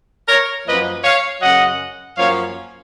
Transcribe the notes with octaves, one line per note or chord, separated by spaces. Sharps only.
A#4 C#5
F#2 F3 A#3 B4 D#5
C#5 F5
F#2 C#3 F#3 D#5 F#5
F#2 F3 A#3 C#5 F5